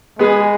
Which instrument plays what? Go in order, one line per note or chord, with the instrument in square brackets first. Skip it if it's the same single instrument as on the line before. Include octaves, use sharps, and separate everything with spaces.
[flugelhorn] G#3 [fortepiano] B3 G#4 B4